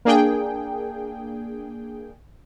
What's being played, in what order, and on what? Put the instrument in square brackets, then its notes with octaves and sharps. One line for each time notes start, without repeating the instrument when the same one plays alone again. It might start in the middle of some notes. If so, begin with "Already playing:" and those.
[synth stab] A#3 D4 G#4 G5